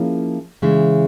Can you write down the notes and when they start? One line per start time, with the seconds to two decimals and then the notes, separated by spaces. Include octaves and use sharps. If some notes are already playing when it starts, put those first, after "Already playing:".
Already playing: F3 A#3 C#4 E4 G#4
0.62 C#3 E3 G#3